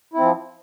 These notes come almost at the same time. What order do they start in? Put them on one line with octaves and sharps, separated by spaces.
E4 C4 F3